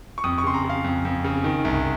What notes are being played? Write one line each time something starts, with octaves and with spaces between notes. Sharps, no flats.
C#6
F2 D#6
C#6
C#3 C6
A#5
C#3 F5
F2
F2
C#3
D#3
C2